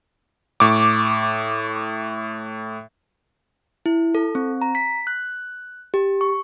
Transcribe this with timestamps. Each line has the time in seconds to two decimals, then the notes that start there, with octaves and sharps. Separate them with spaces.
0.60 A2 C#6 D6
3.86 E4
4.15 A4
4.35 C4
4.61 A#5
4.75 B6
5.07 F#6
5.94 G4
6.21 C#6